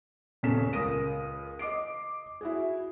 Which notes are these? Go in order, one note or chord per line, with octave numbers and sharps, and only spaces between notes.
D#1 C#3 C#4 A4 B6 E7
C#2 A#4 D#6 A#6 D#7
D#5 D6 C7 D7
E4 F#4 G#4